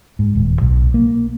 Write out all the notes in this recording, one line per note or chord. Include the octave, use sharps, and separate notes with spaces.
G#2
D#1
B1
A#3